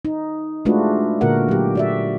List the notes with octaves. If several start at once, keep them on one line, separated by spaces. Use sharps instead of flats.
D#4
G#3 A3 D4 F4 F#4 B4
A#2 D3 A#3 F#4 A#4 F#5
F#3 G4
F#4 D5 E5